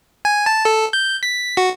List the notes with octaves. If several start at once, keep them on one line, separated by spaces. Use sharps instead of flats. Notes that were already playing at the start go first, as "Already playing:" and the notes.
G#5
A5
A4
G6
B6
F#4